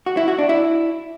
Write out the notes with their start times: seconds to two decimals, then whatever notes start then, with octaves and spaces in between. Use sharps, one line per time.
0.06 F#4
0.17 E4
0.28 F#4
0.39 D4
0.49 E4